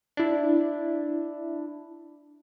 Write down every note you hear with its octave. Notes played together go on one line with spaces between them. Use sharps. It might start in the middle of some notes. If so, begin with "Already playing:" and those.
D4 E4